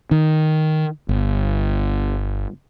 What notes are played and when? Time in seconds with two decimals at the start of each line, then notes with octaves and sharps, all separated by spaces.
0.11 D#3
1.09 G1